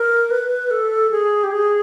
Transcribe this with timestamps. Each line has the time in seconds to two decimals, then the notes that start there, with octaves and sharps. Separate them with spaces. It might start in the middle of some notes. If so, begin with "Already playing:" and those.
Already playing: A#4
0.31 B4
0.71 A4
1.11 G#4
1.44 G4
1.51 G#4